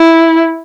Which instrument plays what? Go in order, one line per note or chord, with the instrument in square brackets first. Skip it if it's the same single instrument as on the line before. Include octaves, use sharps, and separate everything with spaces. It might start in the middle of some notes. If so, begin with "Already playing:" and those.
Already playing: [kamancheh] E4